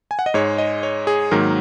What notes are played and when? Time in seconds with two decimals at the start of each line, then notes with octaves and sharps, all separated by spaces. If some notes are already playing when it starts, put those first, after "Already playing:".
0.11 G#5
0.19 F#5
0.26 D#5
0.34 G#2 G#3 C#5
0.58 D#5
0.83 C#5
1.07 G#4
1.31 G#2 D#3 F#3 A#3 A#4